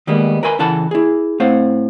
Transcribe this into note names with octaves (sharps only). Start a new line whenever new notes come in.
D#3 G3 G#3 A#3 B3
A#4 B4 E5 G#5 B5 C6
C#3 E3 A4 F#5 A5 B5
E4 G#4
A2 C4 C5 F5 F#5